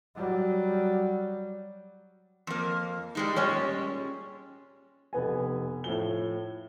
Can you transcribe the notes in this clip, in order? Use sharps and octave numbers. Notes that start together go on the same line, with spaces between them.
F#3 G3
F2 A#3
G3 G#3 D#4
A#2 G3 G#3 C#4
F1 B3 G#5
A2 F3 G7